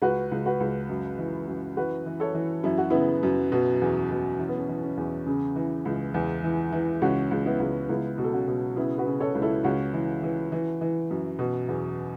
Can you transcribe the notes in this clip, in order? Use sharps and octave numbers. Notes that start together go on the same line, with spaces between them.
C#2 F#4 B4
C#2
F#4 B4
C#2
F#2
E3
F#2
E3 F#4 B4
E3
A4 C#5
E3
F#2 E4
F#4
C#3 B3 E4
F#2
B2
E2
B2
E3 C#4
B3
C#4
E3
C#4
E2
C#3
E3
C#2
E2
E3
E3
C#2 C#4 F#4
C#2
B3 E4
C#2
C#2 B3 E4
B2
A4
C#4 F#4
B2
C#3 B3 E4
F#4 B4
C#3
A4 C#5
C#2
E4 A4
C#2 C#4 F#4
E3
E3
E3
E3
F#2
B2
E2